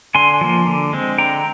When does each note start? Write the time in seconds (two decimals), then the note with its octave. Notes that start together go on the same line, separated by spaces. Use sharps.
0.15 D3 G#5 C6
0.41 F3 A#3
0.67 D3
0.93 G#3 C4
1.18 D3 G5 A#5